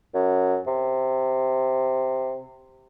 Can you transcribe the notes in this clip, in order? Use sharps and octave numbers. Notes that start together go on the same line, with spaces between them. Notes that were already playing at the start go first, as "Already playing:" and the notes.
F#2
C3